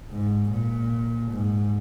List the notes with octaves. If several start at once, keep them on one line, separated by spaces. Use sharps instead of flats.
G#2
A#2
G#2